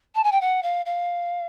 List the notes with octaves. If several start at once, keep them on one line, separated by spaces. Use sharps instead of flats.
A5
G#5
G5
F#5
F5
F5